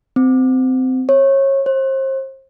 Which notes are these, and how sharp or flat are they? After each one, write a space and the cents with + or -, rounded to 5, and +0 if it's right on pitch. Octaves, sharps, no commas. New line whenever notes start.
C4 -20
C#5 -25
C5 +35